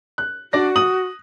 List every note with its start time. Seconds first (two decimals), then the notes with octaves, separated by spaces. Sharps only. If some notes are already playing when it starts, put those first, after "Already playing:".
0.18 F#6
0.53 D4 F#4 D5 A#6
0.76 D#6 F#7